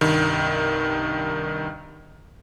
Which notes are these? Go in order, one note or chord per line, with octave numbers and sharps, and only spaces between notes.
C2 G2 D#3